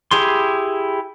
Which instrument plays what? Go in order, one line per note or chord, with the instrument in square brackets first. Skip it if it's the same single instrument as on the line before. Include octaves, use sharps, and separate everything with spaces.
[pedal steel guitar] E4 G4 G#4 C6